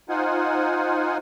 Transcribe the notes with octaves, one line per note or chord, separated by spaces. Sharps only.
D#4 F4 C5 F#5 G#5